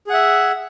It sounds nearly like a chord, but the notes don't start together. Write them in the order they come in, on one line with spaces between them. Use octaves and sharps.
G#4 F#5 E5